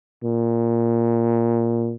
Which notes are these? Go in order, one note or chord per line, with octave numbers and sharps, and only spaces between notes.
A#2